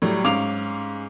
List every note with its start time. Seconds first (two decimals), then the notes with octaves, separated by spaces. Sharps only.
0.02 A2 F#3 G3
0.24 G#2 C#4 F5 D6 F7